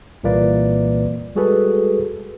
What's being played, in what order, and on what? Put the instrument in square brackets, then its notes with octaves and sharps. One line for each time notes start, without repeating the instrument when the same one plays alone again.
[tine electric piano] C2 A#2 E3 A#3 B4 D5
G3 G#3 F#4 G#4 A4 B4